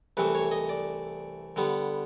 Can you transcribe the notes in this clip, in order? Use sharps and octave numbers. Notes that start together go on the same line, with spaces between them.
C2 C3 E3 A3 B4
C#5
D#5
D5
D3 G3 B3